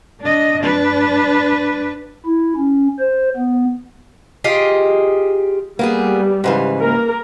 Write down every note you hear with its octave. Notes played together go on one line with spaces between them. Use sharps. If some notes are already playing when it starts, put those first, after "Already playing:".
D4 D#5
D4 B4
E4
C#4
C5
B3
F4 G4 G#4 D#5
G3 A#3 B3 G#4
G#2 C#3 E3
A#3 A#4